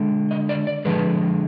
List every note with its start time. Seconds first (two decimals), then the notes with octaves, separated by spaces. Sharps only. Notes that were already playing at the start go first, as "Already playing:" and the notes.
Already playing: D3 G#3
0.31 D#5
0.49 D5
0.67 D5
0.85 D3 F3 G#3 B4